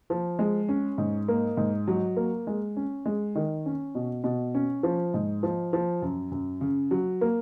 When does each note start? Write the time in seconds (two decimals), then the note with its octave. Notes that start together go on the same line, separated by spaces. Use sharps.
0.10 F3
0.39 G#3
0.69 C#4
0.98 G#2
1.28 A#3
1.57 G#2
1.88 F#3
2.16 A#3
2.47 G#3
2.77 C#4
3.06 G#3
3.35 D#3
3.66 C#4
3.95 B2
4.24 B2
4.54 C#4
4.83 F3
5.14 G#2
5.43 F3
5.73 F3
6.02 F#2
6.32 F#2
6.61 C#3
6.91 F#3
7.21 A#3